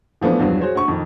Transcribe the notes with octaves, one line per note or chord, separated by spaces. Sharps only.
E3 F3 A3 B3 D4
E2 G2 F3 F#3
F#4 G#4 C5 C#5
D2 C#6
F2 D#3